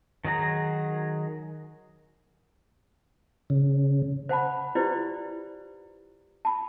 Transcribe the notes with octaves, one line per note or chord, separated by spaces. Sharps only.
D#3 F#3 G#4 A#5
C#3
C5 F#5 A5 B5
E4 F4 G4 B4 C5 D5
A5 B5